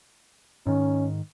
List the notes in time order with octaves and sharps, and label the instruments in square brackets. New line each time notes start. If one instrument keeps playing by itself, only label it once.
[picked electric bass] G#2 D#3 [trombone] C#4